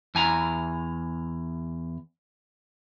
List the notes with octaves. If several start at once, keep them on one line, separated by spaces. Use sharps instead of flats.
E2 G#5 A#5